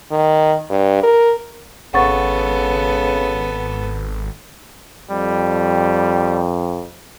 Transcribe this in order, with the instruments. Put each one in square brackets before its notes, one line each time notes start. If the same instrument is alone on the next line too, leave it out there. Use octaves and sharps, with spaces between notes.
[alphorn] D#3
G2
A#4
[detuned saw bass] G#1 [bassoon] C#3 [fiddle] B3 A4 [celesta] F#5 C#6 A6
[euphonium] F2 [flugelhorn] G3